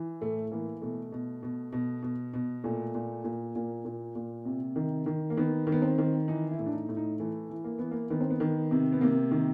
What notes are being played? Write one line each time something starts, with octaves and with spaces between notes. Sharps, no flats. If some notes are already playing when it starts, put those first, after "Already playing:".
Already playing: E3
A2 A3
E3 A#3
B2 A3
B2
B2
B2
B2
B2
A#2 A3
A#2
A#2
A#2 A#3
A#2
A#2
C3
D#3
D#3
A#3
D#3 B3
D#3
B3
C4
D#3
E3 D#4
E4
A2
D4
D#4
A2
D#4
E3 A3
E3
A#3
E3 B3
A#3
D#3 B3
C4
B3
D#3
C3
B3
C3 A#3
D#3